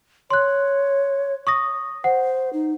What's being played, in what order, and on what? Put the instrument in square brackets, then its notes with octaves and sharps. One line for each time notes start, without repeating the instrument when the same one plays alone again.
[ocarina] C#5 [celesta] C6 F#6
[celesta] C#6 D#6 A#6
[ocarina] C5 [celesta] F#5
[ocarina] D#4